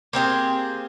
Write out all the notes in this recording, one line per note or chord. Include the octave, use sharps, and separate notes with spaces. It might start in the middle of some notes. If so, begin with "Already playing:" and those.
A#3 C4 G4 G#4